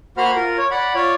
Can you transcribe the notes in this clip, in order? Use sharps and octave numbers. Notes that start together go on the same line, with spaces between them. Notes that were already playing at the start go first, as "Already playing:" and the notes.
A#3 F#4 C5 F#5 B5 F6
F4 A#4
C#5
D5 F#5 B5
F4 C#5 D5